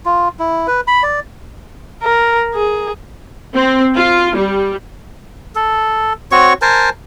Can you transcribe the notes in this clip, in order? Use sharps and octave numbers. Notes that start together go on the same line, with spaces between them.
F4
E4
B4
B5
D5
A#4
G#4
C4
F4
G3
A4
C4 F#4 C#5 C#6
A#4 C5 G#5 A5